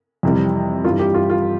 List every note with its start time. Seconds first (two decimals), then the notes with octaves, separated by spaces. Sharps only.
0.23 F2 C3 E3 G3
0.84 G2 E3 G3 F4
0.99 G4
1.14 F4
1.30 F4